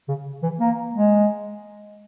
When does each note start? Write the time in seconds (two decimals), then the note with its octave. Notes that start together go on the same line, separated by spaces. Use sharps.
0.08 C#3
0.43 E3
0.60 A#3
0.95 G#3